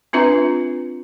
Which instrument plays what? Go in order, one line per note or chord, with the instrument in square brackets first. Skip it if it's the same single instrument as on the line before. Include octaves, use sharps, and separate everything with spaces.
[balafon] C4 D4 F4 B4 E5 A#5